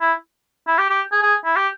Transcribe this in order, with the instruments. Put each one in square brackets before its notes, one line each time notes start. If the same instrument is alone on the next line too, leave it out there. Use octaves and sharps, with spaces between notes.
[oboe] E4
E4
G4
G4
G#4
G#4
E4
G4